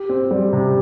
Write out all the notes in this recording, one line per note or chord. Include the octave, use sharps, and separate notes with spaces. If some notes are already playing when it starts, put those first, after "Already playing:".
Already playing: G4
C4
G3
C3